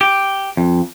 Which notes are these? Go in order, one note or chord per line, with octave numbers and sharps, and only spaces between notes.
G4
F2